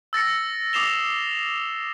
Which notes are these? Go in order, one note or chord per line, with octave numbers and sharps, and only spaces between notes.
E6 A6 A#6 C#7
D6 D#6 C7 E7 F7 G7